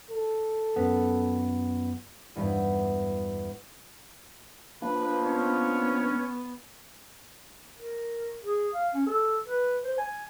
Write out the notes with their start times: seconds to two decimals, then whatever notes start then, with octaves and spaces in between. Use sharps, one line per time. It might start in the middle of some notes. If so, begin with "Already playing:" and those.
0.11 A4
0.76 F#2 B3
2.36 E2 G2
4.82 F3 A#3 D4 B4
5.24 B3 C#4 C#5
7.77 A#4
8.43 G#4
8.74 F5
8.94 C#4
9.06 A4
9.48 B4
9.84 C5
9.98 G#5